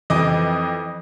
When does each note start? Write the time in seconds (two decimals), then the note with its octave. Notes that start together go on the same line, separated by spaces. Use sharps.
0.10 F2 E3 D#5 D6 D#6